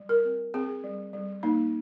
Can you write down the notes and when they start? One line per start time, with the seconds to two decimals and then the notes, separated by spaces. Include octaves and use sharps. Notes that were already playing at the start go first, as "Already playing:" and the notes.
Already playing: G3
0.09 A#4
0.25 C4
0.54 C4 G#4
0.84 G3
1.13 G3
1.43 A#3 D#4